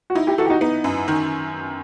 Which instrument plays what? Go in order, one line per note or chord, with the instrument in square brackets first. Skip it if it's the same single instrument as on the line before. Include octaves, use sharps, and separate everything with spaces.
[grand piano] F#4
[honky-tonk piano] D#4 [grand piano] E4
[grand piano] E4 G4
[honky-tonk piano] E3 [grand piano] F#4 A4
[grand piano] G4
D#4 F#4
[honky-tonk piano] B3 [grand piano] D#4
[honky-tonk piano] F#2
D#3